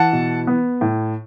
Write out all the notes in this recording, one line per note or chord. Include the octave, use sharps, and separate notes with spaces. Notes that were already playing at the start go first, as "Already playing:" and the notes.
Already playing: E3 F#5 A5
B2
B3
A2